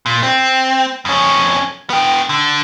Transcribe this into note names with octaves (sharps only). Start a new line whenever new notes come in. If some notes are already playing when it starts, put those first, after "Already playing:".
A#2
C4
F2 C#4
B3 G5
D3